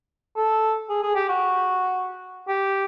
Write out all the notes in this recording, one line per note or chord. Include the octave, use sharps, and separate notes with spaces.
A4
G#4
G#4
G4
F#4
G4